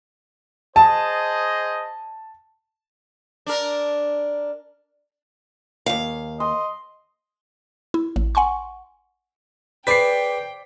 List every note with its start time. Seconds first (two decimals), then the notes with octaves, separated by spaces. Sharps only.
0.76 G#4 C5 D#5 A5
3.46 D4 A#4
5.86 D#2 F5
6.40 D#5 C6
7.94 E4
8.16 A1
8.35 F#5 G#5 C6 C#6
9.87 G#4 B4 C5 D5 G5 B6 C7